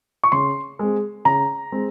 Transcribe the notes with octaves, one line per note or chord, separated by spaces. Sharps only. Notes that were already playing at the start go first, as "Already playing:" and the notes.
C#6
C#3 C6
G#3 C4
C#3 A#5
G#3 C4